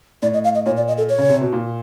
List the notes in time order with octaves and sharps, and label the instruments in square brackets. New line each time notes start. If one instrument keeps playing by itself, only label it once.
[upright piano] A2 [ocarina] D5
[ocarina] D#5
F5
D#5
[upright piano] A#2 [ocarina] C#5
[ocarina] D5
D#5
A4
C#5
[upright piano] C#3
C3
B2
A#2